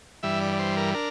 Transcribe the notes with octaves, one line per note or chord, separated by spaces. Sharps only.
G2 E3 G3 E5
D5
D5
C5
A#4
D4 A#4